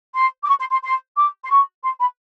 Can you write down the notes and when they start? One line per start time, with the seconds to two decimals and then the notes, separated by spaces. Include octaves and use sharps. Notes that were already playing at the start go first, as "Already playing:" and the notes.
0.15 C6
0.44 D6
0.49 C#6
0.60 C6
0.71 C6
0.82 C6
1.16 D6
1.44 C6
1.50 C#6
1.83 C6
1.99 B5